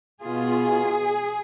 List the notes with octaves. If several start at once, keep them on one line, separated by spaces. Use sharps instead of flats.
B2 B3 F4 G#4